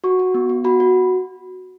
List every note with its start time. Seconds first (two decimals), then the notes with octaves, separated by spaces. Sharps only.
0.04 F#4 C#6
0.19 F#4
0.34 B3
0.49 B3
0.64 F#4 B5
0.80 F#4